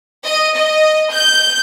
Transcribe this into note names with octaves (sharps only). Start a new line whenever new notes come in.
D#5
D#5
G6